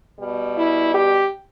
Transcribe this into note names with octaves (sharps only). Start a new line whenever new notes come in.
B2 G3
E4
G4